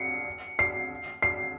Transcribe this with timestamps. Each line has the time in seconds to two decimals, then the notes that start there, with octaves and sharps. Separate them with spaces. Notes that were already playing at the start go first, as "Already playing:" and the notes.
Already playing: C7 C#7
0.59 C7
1.22 C7